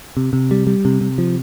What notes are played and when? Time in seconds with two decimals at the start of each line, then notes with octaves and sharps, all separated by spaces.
0.17 C3
0.33 C3
0.51 G3
0.67 G3
0.85 C3
1.01 C3
1.18 F3